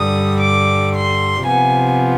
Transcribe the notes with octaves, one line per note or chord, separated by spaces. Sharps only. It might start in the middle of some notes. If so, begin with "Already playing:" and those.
Already playing: G2 D3 G3 D#6
D6
C6
C3 F3 B3 G#5